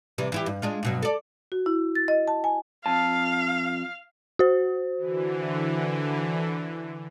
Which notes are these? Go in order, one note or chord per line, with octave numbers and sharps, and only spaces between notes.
C3 E3 G3
E3 E4 G4
G2
G#3 D4 F4
G2 B2 F#3
A4 D5
F#4
E4
A6
D#5
A5
G#5
F2 F5 A5
F#4 C5
D3 E3